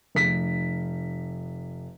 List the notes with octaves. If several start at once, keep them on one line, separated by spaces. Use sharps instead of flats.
F1 B6